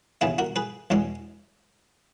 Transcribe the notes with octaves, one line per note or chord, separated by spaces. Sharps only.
D#2 C#3 E3 B3 E4 G#4
F#4 A#4
G#4 B4
E2 B2 G#3 C#4